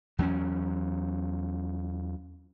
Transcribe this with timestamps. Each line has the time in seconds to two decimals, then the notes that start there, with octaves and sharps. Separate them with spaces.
0.19 E2 F#3 B3 C#4